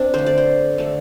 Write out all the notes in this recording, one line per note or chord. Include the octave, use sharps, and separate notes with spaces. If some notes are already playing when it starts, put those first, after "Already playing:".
Already playing: C4 D4
D3 A3 C5
D5
C5
D3 A3